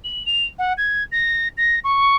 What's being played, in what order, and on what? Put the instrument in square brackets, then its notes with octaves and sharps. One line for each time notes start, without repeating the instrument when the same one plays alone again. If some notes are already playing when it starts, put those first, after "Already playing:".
[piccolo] F#7
F7
F#5
G#6
A#6
A#6
C#6